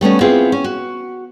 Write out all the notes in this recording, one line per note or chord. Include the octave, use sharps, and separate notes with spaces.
G3 A3 B3 C#4
B3 C4 E4 F4 G#4
C#4
F#4